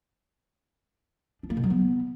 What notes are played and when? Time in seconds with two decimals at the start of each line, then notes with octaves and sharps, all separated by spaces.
1.43 D4
1.50 A#3
1.57 B2
1.64 F#3
1.70 B3